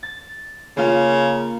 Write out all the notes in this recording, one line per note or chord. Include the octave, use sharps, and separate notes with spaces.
A6
C#3 A#3 F4